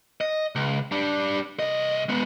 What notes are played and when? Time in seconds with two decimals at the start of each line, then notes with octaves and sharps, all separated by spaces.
0.21 D#5
0.55 C#2
0.92 G3 D4
1.59 C2 D#5
2.09 G#3 B3